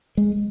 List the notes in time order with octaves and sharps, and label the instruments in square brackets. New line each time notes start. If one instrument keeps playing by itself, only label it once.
[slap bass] G#3